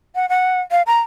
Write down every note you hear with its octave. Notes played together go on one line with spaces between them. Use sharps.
F#5
F#5
F5
A#5